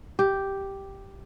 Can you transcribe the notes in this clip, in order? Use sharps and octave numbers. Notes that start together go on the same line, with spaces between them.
G4